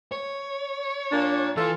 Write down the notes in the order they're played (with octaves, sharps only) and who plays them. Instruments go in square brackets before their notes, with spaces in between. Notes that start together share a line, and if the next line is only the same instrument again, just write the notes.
[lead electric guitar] C#5
[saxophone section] A#2 A#3 D4
[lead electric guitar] E3 [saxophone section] F4 A4